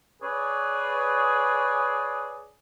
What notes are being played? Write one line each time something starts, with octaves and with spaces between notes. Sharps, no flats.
G#4 B4 C#5 D5